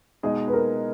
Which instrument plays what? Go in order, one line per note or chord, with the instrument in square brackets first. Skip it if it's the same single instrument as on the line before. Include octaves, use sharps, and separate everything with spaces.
[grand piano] B2 G#3 D#4 G#4 [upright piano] D#5
[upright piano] B4
A#4